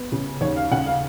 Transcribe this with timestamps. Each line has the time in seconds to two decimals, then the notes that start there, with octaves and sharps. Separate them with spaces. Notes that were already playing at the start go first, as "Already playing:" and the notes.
Already playing: B3
0.12 C#3
0.41 D#2 C#5
0.56 F5
0.71 C#3 F#5
0.86 F5